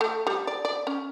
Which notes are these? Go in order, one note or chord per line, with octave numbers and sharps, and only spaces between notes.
A3
G3
D5
D5
C#4